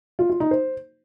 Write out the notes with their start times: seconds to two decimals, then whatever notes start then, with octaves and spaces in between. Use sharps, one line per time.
0.19 F4
0.30 F4
0.40 D#4
0.51 C5